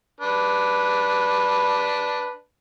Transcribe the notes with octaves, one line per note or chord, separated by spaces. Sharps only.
D4 B4